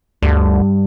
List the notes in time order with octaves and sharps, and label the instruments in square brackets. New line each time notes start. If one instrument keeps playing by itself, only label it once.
[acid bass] D2 [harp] G2